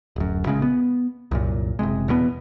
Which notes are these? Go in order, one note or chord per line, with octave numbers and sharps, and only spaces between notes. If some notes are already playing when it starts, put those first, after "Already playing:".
D1 F#2
A#1 C#3 G#3
B3
C2 F#2 A#2
F#1 E2 C3 G#3
E2 B2 G3 B3